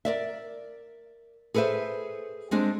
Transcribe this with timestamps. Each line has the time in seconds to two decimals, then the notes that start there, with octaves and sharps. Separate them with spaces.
0.05 A#4 D5 E5
1.54 G#4 A4 B4 C5 E5
2.51 G3 G#3 C4 D4 G#4